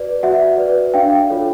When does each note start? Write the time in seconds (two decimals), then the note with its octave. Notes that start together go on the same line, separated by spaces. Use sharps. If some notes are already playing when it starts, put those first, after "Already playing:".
Already playing: F#4 B4 D5
0.23 F#4 E5 F#5
0.58 B4 D5
0.94 D4 F5 G5
1.30 F4 A4 C#5